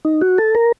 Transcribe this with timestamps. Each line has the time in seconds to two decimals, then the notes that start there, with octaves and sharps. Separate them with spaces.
0.05 D#4
0.21 F#4
0.38 A4
0.55 A#4